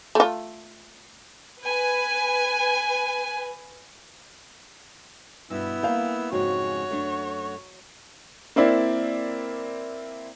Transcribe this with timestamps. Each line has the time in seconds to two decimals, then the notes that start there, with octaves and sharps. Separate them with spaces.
0.15 A3 F4
1.62 B4 G#5
5.50 G2 B2 B3 E4 E6
5.83 A#3 F5 G5
6.32 F2 G#2 C#3 F#3 F#4 C#5
6.88 F#2 A3 D4
8.56 A#3 C4 E4 D5